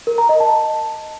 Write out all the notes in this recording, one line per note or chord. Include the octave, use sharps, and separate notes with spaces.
A#4
A#5
D#5
A5